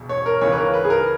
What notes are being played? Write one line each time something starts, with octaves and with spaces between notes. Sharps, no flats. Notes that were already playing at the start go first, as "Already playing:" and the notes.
Already playing: E1 B2
C#5
A#4
C#2 C#3 E3 C#5
B4
A#4
B4
G#4
A#4